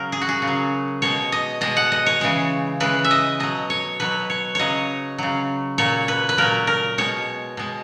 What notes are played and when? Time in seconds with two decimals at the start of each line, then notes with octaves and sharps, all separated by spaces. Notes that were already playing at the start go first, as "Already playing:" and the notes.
Already playing: C#3 F#3 A#4
0.12 G#4
0.21 F#4
0.29 G#4
0.42 C#3
0.47 F#3
1.02 B2 G#3 C#5
1.32 D#5
1.61 B2 G#3 D#5
1.77 F#5
1.92 D#5
2.06 C#5
2.21 C#3 E3 G#3
2.80 C#3 E3 G#3 B4
3.04 E5
3.11 D#5
3.40 B2 F#3 D#5
3.70 C#5
4.00 B2 F#3 B4
4.30 C#5
4.55 C#3 F#3 C#5 D#5
5.18 C#3 F#3
5.78 A#2 F#3 C#5
6.08 B4
6.29 B4
6.38 A#2 F#3 A#4
6.67 A#4
6.98 B2 G#3 C#5
7.57 B2 G#3